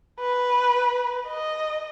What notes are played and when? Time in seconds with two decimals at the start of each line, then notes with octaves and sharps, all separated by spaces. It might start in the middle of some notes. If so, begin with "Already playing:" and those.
0.20 B4
1.28 D#5